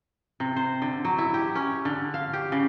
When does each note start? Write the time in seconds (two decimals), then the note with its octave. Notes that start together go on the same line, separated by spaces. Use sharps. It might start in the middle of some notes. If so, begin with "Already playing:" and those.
0.40 C3
0.56 C5
0.82 D3
1.05 F#3
1.18 E4
1.34 G4
1.55 C#4
1.85 D3
2.14 F5
2.33 G4
2.52 C#3